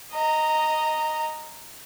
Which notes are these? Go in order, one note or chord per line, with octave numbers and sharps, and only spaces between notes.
D#5 A#5